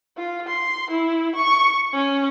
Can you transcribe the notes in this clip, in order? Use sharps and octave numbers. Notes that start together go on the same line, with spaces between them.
F4
C6
E4
C#6
C#4